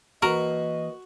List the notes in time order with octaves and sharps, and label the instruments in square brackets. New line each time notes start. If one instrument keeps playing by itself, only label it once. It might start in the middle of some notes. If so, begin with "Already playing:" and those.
[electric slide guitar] E3 A#3 B4 [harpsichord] F#4 [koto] A#4 [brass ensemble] D#5